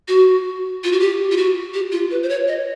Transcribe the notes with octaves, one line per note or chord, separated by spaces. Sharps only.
F#4
F4
F#4
G4
F4
F#4
G4
F4
B4
C5
C#5
D#5